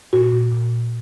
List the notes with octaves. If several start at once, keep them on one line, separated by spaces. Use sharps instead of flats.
A#2 F#4
A#2
A#2
A#2